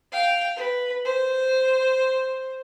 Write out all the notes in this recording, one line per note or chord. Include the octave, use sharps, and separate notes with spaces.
F5 G5
B4
C5